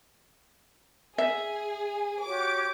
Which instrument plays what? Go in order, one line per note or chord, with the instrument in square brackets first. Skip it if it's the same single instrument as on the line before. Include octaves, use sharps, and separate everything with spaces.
[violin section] G#4 [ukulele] E5
[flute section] F#4 G4 C#5 [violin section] D6